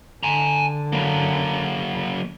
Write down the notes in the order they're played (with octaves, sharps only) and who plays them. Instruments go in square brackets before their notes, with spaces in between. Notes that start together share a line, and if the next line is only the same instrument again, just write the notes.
[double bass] D3 [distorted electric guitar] G#5 A#5
[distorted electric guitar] F#3 A#3